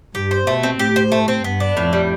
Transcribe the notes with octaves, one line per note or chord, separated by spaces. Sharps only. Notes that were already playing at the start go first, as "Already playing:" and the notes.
G2 G4
C5
B2 A3
C4
A2 G4
C5
A3
C4
G2 B3
D4
F2 A2
G3